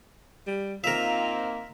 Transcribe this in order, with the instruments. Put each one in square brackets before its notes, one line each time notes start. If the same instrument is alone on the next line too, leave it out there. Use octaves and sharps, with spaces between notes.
[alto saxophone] G3
[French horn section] A#3 C4 D#4 [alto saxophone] F4 [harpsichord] A#4 E5